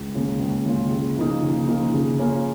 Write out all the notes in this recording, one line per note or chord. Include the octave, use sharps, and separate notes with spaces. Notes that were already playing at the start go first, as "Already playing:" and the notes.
Already playing: C#2
C#3 A#3 C#4 F4
C#2
C#3 A#3 C#4 F4
C#3
F3 A#3 D#4
C#3
F3 A#3 D#4
C#3
A#3 C#4 F4